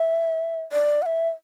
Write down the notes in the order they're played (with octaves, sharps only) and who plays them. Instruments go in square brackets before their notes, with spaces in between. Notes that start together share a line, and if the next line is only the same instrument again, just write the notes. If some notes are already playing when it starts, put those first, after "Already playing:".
Already playing: [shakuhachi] E5
D5
F#5
E5